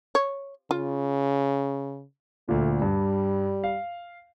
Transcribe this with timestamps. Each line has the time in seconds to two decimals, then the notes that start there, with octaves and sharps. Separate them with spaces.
0.15 C#5
0.71 C#3 F4
2.49 D2 A#2 A3
2.82 G2 G3
3.64 F5